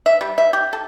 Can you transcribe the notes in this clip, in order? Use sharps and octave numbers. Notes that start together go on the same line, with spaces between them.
E5
G3
E5
G4
A4